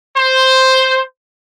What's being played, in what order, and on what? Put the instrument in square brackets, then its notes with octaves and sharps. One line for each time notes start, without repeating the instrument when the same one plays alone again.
[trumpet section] C5